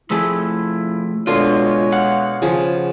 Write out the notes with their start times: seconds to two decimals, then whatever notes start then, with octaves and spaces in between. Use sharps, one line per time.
0.11 F3 A3 E4 G#4 A5 E6
1.27 B2 G#3 D4 F4 A4 C5 C#5 C6
1.92 F5 F#5
2.42 C#3 F3 G#4 B4